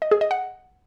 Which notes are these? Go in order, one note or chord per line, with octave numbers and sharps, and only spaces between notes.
D#5
G#4
D#5
F#5